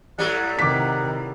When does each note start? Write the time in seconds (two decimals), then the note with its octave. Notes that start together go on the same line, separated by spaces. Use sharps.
0.18 A2 F#3 G3 F#5
0.59 C3 D#3 F#5 D6 B6